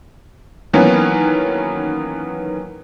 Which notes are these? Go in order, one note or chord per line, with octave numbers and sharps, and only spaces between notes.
D#3 E3 F#3 A#3 B3 C#4